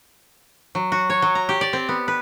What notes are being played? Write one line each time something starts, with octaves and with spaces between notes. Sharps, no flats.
F#3
F#4
C#5
F#3
A#5
G4
D5
C4
B3
B4